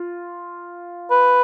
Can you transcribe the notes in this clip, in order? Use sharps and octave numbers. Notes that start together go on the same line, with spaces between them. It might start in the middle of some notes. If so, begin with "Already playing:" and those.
Already playing: F4
B4